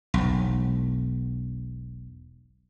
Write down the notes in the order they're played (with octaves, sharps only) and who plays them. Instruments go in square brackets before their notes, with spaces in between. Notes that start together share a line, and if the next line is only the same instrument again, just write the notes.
[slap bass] E1 B1